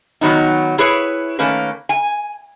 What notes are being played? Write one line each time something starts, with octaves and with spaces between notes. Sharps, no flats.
D#3 F#3 B3 D#4
E4 G#4 B4 C#5
D#3 A3 A#3 C#4 B4
G#5